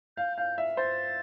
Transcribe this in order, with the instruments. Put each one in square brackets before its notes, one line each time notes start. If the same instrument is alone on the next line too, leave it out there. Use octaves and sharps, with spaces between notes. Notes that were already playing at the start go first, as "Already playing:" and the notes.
[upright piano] F5 [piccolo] G6
[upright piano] F5 [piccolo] G6
[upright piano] E5
[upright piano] C5 [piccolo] A6